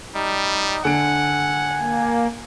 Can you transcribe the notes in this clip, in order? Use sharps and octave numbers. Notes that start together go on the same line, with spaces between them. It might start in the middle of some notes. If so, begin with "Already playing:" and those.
G3 D#4
D3 F#5 G#5 D7
A#3